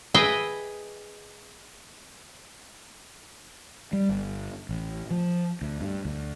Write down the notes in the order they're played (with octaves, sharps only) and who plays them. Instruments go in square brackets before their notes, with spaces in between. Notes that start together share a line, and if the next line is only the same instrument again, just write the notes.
[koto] G#4 B4 D#5 E5 G5
[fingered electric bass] G3
G1
A1
F3
D2
G2
D2